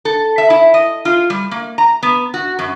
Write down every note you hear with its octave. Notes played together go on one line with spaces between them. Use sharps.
A4
E5
E4
D#5
F4
G3
A#3
A#5
B3
F#4
F#2